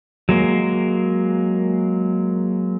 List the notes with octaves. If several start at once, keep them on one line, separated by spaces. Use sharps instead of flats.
F#3 G#3 A#3